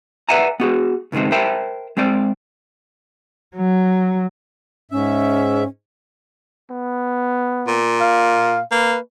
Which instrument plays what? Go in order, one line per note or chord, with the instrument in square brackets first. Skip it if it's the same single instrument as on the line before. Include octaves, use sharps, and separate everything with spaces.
[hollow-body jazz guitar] B4 D5 E5 F#5 G#5 A#5
B3 F#4 G#4
C#2 G#2 D#3 G#3 C4
A#4 C5 E5 G5 A5 B5
G#3 C4 C5 D5
[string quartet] F#3
[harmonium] G#2 E5 [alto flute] C#4
[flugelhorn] B3
[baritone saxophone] A#2
[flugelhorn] F5
[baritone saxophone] A#3 [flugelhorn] B4